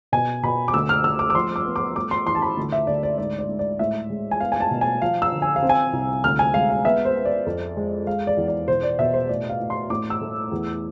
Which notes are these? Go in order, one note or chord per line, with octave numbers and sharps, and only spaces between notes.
B2 G#5
B2 B5
D6
D2 E6
F6
A3 E6
D6
D6
F3 C6
D6
B3
D6
A3 D6
C6
E3 C6
A5
B5
D2
E5
D2 D5
D5
G#2 D5
D5
G#2
D5
A2 E5
G#3
G#5
B3 F5
G#5
A5
B2
G#5
F3 F5
E6
D3
G#5
F5
C4
G#5
C2
D2 F6
G#5
G#3 F5
F5
B3 E5
C5
B3
D5
F2
G#3
G#3 F5
D5
E2
D5
B2 C5
D5
B2 E5
C5
A2 D5
F5
A2
C6
A2 D6
E6
A3
E2